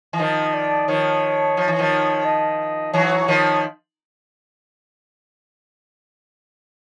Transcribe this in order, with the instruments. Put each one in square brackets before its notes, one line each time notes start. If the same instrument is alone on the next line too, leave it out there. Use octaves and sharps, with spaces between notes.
[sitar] E3
[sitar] D#3 F3 [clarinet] D#5
[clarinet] D5
[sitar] D#3 F3 [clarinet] C#5
[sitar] F3
E3
D#3 F3
[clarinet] D#5
[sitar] E3 F#3 [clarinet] C#5
[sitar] D#3 F3